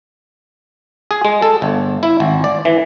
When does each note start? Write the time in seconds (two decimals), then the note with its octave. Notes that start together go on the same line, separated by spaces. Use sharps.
1.11 G#4
1.25 G#3
1.42 A4
1.62 G1
2.03 E4
2.20 G#1
2.44 D5
2.65 E3